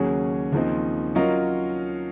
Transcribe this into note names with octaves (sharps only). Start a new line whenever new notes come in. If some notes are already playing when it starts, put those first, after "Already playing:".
Already playing: D#2 C#3 F#3 C#4 G#4
D#2 C#3 F3 C4 D#4
F#3 C#4 F4 A#4 D#5